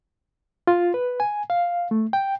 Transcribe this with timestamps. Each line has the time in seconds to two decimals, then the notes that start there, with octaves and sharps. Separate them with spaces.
0.67 F4
0.94 B4
1.20 G#5
1.50 F5
1.91 A3
2.13 G5